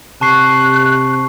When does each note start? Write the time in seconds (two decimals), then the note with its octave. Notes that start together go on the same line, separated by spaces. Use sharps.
0.21 C3 A5 C#6 F#6 C7